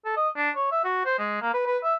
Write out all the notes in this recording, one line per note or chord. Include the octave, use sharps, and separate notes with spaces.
A4
D#5
D4
C#5
E5
F#4
C5
G#3
A#3
B4
B4
E5